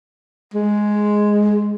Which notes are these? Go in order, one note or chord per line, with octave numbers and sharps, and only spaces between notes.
G#3